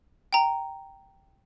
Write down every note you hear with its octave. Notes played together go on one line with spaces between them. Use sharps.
G5 A#5